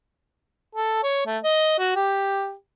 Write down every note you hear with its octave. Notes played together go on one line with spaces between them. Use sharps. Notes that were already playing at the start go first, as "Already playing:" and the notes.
A4
C#5
A3
D#5
F#4
G4